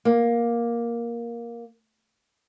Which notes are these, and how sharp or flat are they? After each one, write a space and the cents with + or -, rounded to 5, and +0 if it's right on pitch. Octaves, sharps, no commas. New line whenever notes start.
A#3 +10